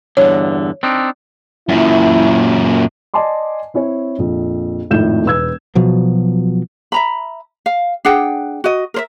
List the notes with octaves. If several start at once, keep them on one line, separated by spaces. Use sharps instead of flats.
E2 G2 D3 C#5
C4 D4 D#4
F#2 A#2 E4
D5 D#5 G#5 A5 C6 D6
C4 E4 C#5
A#1 F2
G#1 F2 A2 G6 E7
E1 B4 E6 G#6
B2 F3 F#3
E5 A#5 B5
F5
D4 G#4 F#5 G5
F#4 D#5
A#4 C5 E5